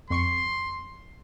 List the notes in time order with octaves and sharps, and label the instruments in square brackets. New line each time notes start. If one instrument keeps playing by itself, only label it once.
[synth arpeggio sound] F2 C#6 C#7 [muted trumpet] C6